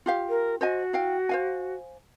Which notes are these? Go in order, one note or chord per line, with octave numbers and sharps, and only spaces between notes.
F4 G4 F5
A#4
F#4 C5 D#5 G#5
E4 F5 G5
C5 F5 G#5